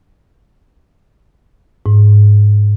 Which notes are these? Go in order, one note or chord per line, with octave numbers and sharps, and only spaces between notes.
G#2